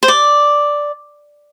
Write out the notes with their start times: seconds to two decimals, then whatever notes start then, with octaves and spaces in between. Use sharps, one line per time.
0.03 C5
0.08 D5